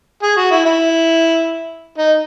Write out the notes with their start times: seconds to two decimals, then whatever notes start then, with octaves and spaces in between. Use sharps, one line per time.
0.23 G#4
0.37 F#4
0.51 E4
0.65 E4
1.98 D#4